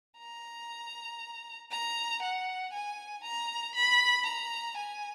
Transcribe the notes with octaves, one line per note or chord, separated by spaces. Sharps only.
A#5
A#5
F#5
G#5
A#5
B5
A#5
G#5